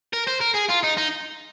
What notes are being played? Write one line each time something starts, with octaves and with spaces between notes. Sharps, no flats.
A#4
C5
A#4
G#4
F4
D#4
D#4